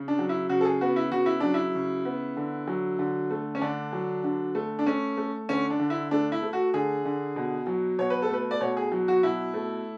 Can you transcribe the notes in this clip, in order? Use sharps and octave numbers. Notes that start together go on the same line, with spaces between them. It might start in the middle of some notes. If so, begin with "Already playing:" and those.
Already playing: C#3
D4
F#3
E4
C#3 F#4
A4
G#4
B3 F#4
E4
C#3 F#4
E4
F#3 D4
E4
C#3
B3
D3
F#3
D3
A3
C#4
D3 D4
F#3
D3
A3
D4
A3 C#4
A3
D3 C#4
D4
D3
E4
A3 D4
E4
A3
F#4
D3 G#4
D3
B2
F#3
B2 C#5
B4
A4
A3 B4
D5
B2 C#5
G#4
F#3
F#4
B2 E4
A3